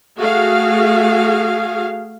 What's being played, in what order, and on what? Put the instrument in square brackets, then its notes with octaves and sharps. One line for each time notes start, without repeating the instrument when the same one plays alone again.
[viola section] A3 F#4 G#4 F5